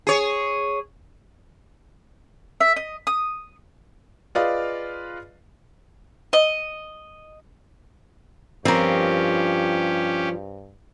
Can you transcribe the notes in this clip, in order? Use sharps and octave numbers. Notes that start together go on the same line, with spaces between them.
G#4 C#5
E5
D#5
D#6
F4 G#4 B4 D5 D#5 F5
D#5
G2 F3 C4 C#4 G4 A#4